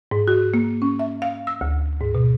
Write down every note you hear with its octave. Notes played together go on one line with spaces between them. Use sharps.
G#2
F#4
A#3
C#4
E5
F5
E6
D2
G#2
B2